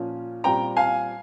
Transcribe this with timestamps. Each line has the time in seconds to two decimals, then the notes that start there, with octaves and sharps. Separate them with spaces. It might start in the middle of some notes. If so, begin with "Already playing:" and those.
Already playing: A#2 F3 A#3 C#4
0.44 A#2 G3 C4 G5 A#5
0.76 F5 G#5